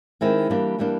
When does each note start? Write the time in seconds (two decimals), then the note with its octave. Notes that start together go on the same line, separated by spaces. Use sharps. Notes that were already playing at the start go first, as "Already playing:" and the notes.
0.21 D#3 G#3 C4 E4
0.50 E3 G3 A#3 D4
0.79 E3 G3 A#3 D4